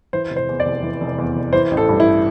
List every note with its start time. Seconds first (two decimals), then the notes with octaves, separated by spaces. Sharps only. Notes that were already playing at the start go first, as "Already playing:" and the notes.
0.13 E3 C5
0.30 F1
0.36 C5
0.48 E2
0.60 D5
0.66 F1
0.83 E3
1.01 F1
1.18 E2
1.36 F1
1.53 E3 C5
1.71 A1
1.77 A4
1.89 G2
2.00 E4